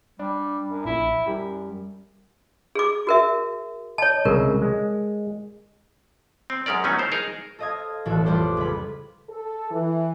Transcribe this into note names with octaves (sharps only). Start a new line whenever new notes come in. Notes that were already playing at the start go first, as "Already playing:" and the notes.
G3 D4
F#2
A#1 E4
F#2 G3
G#4 D6
F#4 A#4 E5
C#5 D#5 A5
C2 C#3 G#3 A#4
G#3
C4
F#2 G#3 C#4 A#4 D5
D#3 F#3 A3 B3 C#4 D#4
A#4 C5 A5
D#4 G#4 A#4
A4 C5 D#5 F5 D#6 G#6
E1 A1 E3 F#4 A4 C#5
F2 G3 B4 C5 D5 C6
C#2 B5
A4
E3